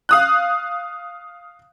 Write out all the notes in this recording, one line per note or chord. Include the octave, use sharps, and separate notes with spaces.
F5 D#6 F#6